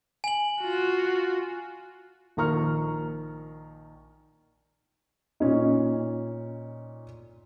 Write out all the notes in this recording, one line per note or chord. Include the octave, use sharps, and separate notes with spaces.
G#5 F#7
F4 F#4
A#1 D#3 A#5 C#6 F6
A#2 C#4 D#4